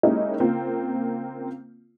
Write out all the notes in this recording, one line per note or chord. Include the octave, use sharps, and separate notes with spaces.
G#3 A#3 C#4 D#4 E4 G4
C#3 A#3 C4 F4